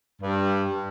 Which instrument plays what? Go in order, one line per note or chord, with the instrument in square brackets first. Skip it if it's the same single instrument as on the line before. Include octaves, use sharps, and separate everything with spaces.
[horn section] G2